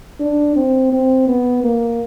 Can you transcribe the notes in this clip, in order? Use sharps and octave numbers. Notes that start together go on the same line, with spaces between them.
D4
C4
C4
B3
A#3